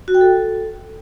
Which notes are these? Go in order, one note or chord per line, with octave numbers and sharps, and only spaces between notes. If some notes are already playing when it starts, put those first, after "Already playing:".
F#4
G5
A4